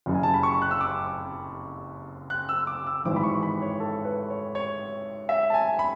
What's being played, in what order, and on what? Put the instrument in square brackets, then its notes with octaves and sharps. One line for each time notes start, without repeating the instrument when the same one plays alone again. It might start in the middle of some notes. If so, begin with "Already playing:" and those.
[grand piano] F#1 F#2 C#3
G#5
A5
B5
C#6
F#6
E6
D6
F#6
E6
D6
E6
G#1 G#2 E3 D6
B5
C#6
B5
C#5
A4
B4
C#5
C#5
E5
A5
G#5
B5